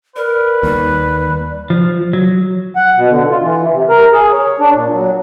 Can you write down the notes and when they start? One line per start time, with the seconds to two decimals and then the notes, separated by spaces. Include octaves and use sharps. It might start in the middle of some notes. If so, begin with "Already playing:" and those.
0.16 A#4 B4 D5
0.63 D#2 G3
1.70 F3
2.13 F#3
2.76 F#5
2.97 B2
3.10 D3
3.30 F4
3.42 E3
3.72 C3
3.89 A#4
4.12 G#4
4.33 C#5
4.60 D4
4.75 A#2
4.93 F#3